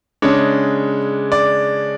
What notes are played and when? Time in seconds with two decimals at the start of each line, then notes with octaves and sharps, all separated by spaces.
0.22 C#3 G#3 D4 C#5
1.32 D5